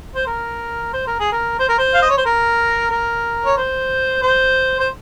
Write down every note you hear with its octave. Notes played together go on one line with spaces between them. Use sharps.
C5
A#4
C5
A#4
G#4
A#4
C5
A#4
C5
F5
D#5
C#5
C5
A#4
A#4
C#5
C5
C5
C5